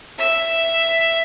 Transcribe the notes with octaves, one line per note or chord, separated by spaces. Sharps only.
E5